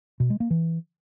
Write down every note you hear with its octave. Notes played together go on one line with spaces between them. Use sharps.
B2
G#3
A#3
E3